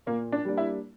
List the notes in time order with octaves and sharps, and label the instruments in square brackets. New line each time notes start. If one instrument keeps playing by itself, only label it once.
[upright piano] A#2 [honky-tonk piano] A#3
[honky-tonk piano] D4
[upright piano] G3 A#3 D4
[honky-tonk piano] E4